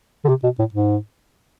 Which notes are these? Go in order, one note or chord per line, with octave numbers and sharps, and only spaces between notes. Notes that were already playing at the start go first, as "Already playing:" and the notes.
D3
C3
B2
A2
G#2